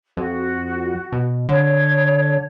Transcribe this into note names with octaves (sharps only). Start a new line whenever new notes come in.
F2 F#4
B2
D3 C#5